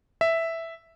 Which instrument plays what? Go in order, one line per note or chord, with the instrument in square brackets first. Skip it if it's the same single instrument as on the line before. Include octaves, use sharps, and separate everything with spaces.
[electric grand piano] E5